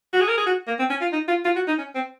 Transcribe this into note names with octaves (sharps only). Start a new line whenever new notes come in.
F#4
G#4
A#4
G#4
F#4
A#3
C4
C#4
F4
D#4
F4
F4
F#4
D#4
C#4
C4